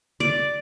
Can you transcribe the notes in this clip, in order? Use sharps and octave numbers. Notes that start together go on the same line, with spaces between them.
D5